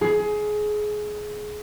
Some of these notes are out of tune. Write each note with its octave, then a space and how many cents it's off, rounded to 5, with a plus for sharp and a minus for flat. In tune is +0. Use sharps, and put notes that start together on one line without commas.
G#4 +20